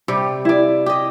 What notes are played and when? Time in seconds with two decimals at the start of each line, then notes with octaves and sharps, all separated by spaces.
0.08 C3 G3 G4
0.45 E4 D5
0.86 G4 D#5